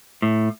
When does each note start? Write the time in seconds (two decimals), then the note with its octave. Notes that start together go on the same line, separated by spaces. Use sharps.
0.22 A2